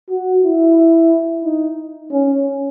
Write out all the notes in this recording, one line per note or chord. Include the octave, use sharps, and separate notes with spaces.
F#4
E4
D#4
C#4